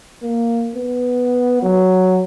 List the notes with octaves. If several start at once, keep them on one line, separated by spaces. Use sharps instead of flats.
A#3
B3
F#3